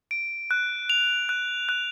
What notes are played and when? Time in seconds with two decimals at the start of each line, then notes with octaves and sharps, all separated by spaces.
0.11 D7
0.51 F#6
0.90 F7
1.29 F#6
1.69 F#6